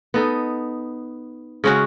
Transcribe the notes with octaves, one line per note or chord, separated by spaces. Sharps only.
B3 D#4 A4
C#3 G#3 C#4 F#4